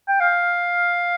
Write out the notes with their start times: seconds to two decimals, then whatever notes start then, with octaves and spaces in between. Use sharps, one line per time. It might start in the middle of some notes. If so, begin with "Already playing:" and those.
0.08 G5
0.20 F5